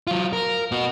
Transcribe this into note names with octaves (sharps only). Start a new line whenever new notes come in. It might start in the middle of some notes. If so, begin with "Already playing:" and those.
F#3 F4
A#4
B3 F#4